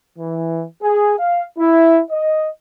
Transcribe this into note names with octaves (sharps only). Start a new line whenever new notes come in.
E3
G#4
F5
E4
D#5